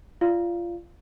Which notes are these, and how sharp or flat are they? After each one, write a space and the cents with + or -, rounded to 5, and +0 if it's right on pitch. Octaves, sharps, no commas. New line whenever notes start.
F4 -20 D5 +0 F5 -10